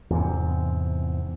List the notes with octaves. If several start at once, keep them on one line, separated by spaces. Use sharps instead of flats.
E2 G#2 C3